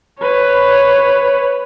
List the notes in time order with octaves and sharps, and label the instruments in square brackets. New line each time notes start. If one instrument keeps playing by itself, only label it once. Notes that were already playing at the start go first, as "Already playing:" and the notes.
[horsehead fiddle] B4 C#5